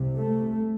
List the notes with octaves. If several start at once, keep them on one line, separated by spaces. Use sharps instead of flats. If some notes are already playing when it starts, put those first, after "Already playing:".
Already playing: C2 C3
A3